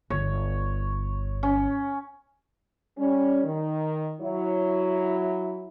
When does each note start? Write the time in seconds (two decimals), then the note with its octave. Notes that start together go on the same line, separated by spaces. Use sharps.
0.10 G1 C#5
1.43 C#4
2.98 G3 C#4
3.44 D#3
4.21 F#3 E4